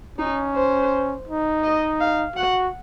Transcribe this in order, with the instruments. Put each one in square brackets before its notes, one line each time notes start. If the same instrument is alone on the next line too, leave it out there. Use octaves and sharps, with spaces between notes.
[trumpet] C#4 [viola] D#4
[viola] C5
[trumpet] D#4
[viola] D#5
F5
[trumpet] F#4 [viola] F#5